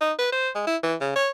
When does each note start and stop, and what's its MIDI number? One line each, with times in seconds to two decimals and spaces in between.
0.01 0.13 63
0.19 0.32 71
0.32 0.49 72
0.55 0.63 56
0.67 0.77 64
0.83 0.95 52
1.01 1.12 49
1.16 1.30 73